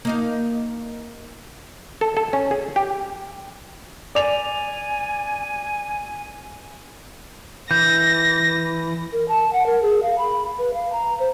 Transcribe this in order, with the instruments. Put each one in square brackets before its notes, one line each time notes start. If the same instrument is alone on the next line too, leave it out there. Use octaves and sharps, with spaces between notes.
[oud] A#3 D#4 F5
[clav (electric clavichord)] A4
A4
C#4
G#4
G4
[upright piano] D5 F7 [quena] G#5
[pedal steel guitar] E3 [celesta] G6 [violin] A#6
[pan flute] A#4
A5
F#5
A#4
G#4
F5
B5
B4
F5
A#5
C5